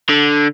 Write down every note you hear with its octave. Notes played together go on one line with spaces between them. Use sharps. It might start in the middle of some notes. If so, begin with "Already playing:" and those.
D3